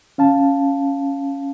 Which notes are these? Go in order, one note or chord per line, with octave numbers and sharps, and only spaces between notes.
C#4 F5 A5